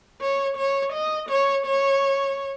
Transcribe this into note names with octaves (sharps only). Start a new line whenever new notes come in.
C#5
C#5
D#5
C#5
C#5